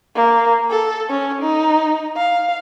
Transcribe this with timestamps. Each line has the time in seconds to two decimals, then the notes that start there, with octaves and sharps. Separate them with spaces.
0.16 A#3
0.71 A4
1.10 C#4
1.41 D#4
2.17 F5